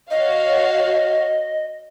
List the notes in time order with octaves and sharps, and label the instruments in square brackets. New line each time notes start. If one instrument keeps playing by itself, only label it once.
[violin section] F#4 C#5 F5 [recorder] D#5